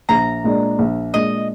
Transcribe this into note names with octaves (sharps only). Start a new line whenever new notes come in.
A#1 A#5
A#2 G#3 D4
A#1
A#2 G#3 D4 D#5